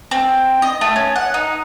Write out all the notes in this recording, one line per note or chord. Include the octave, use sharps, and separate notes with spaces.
C4
D#5
A3
C#4
F#5
D#4